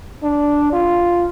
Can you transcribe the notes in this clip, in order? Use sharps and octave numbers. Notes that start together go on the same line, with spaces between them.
D4
F4